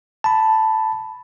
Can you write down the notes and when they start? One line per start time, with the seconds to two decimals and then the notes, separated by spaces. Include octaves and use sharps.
0.24 A5 B5